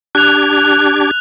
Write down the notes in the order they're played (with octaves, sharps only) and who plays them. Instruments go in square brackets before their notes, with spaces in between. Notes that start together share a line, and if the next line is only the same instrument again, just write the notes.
[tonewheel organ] D4 G4 G#6 [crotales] F#6 F7